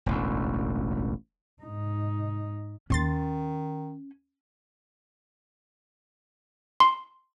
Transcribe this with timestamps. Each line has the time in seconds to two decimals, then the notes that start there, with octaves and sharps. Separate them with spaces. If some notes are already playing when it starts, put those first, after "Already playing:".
0.06 E1 A1 D2
1.62 G#2 D#4
2.90 D#2 D#3 C#4 C6 A6
6.80 C6